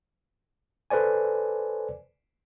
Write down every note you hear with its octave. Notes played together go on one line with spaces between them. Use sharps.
A4 B4 C5 D5 G#5